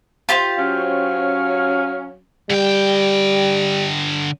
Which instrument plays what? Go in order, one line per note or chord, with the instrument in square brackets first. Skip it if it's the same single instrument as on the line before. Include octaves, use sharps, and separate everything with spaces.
[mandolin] F4 G4 C5
[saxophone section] F#3 C#4 [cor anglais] F5
[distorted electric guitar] D3 G5 [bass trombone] G3